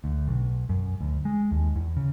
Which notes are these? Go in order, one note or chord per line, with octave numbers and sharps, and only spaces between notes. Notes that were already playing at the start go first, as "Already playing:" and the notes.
D2
B1
F#2
D2
G#3
D#2
E2
C#3